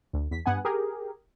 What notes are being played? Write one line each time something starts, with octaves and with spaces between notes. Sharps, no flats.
D2
E2 B6
G2 B3 F#5 G#5
G4 G#4 A#4